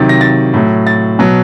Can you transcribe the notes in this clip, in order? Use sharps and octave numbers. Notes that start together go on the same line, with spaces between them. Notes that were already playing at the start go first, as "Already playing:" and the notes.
Already playing: C3 D#3 F#3 A6
A#6
A6
A2 F#3
A6
B2 F#3